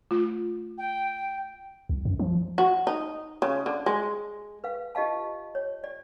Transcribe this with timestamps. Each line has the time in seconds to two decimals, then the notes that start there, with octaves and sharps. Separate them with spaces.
0.11 A3 F4
0.78 G5
1.89 C2
2.05 F#2
2.19 F3
2.58 F#4
2.87 D#4
3.42 C#3
3.66 D3
3.86 G#3
4.64 B4 F5
4.95 F4 G4 D#5 F5 A5
5.55 C#5
5.84 D5